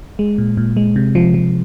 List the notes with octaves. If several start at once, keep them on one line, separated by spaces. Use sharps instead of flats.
G#3
A#2
A#2
G#3
C3
F3
F3